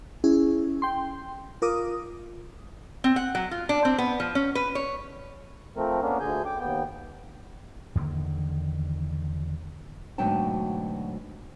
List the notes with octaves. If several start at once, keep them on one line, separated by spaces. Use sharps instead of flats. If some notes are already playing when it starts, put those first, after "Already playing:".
C#4 E4 G#4
G5 C6
F4 A#4 D6 D#6
C4
F#5
F#3
F4
D4
C4
B3
F3
C#4
B4
C#5
F3 A3 C4 A#4
A#3 B3 C#4 D4 A#4
D2 D3 G#4 G#5 G6
G5 D6
D#2 B3 G5
E2 D3 D#3 A#3
D2 G#2 B2 F#3 G5 A5